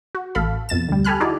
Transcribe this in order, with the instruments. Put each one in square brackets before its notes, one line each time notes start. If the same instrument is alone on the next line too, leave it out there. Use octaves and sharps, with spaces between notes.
[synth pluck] F#4
A1 A4 F5 B5
F2 B2 A6 E7
D2 G3
G4 A4 G#5 B5 F6 F#6
D#4 E4 F#4 G#4 D5